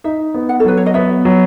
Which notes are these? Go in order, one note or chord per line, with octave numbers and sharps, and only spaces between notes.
D#4 E5
B3
F#5
A4
F#3 B4
C#5
D#5
B3 E5
F#3